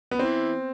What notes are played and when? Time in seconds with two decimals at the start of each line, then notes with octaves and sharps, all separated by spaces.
0.11 B3
0.19 E3 C4